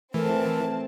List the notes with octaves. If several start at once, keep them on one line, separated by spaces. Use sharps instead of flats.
E3 A3 C4 A#4 A5